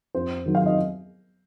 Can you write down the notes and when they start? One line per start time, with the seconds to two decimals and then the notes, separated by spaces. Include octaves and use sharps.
0.14 F2 C5
0.46 D#3 F#3
0.55 F5
0.66 D#5